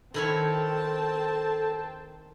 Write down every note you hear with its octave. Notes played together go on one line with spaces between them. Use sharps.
D#3 C4 E4 A4 C#5 G5 A5